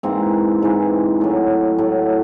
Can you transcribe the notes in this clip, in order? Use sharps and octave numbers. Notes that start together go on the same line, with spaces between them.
G#2 E3 A#3 C4
G#2 E3
A2 F#3
A2 F#3